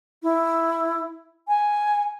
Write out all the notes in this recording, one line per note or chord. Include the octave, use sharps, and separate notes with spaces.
E4
G#5